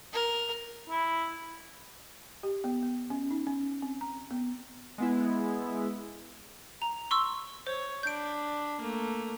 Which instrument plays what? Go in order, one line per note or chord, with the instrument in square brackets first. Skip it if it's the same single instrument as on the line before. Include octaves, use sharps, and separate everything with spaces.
[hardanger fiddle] A#4
[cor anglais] E4
[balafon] G4
B3
B3
C#4
D#4
C#4
C4
A#5
B3
[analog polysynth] G#3 B3 E4
[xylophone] A#5
C6 C#6 E6
[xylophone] C5 [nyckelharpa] C#5
[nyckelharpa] D4 B5 [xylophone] G6 D7
[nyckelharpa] A3 A#3